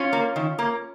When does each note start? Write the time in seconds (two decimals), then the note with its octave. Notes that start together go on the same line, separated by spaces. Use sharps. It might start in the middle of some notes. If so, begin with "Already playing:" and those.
Already playing: C#4 F4
0.13 A#3
0.36 D#3
0.59 A#3